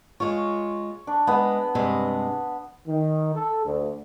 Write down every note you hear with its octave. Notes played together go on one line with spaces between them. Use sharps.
G#3 F4 C#5
D4
G#3 B3 B4
G2 C3 G#3
D#3
A4
D2